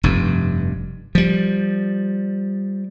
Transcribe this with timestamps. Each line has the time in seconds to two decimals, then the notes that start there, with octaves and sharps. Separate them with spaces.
0.03 F1 G2
1.15 F3 G3